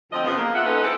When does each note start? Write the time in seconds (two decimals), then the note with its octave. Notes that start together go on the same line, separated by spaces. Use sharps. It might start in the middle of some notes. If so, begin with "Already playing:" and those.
0.12 D2 F3 C4 D#5
0.24 F2 C#3 F3 B3
0.37 A#3
0.55 F4 E5 F#5
0.66 C#4 D#4 F4 A4 B4 D#5
0.83 G#3 C4 E4 G4 A4